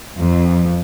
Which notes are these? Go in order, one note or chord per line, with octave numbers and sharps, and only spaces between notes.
F2